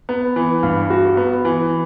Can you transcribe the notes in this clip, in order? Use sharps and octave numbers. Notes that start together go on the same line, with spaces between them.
B3
E3
G2
F#4
B3
E3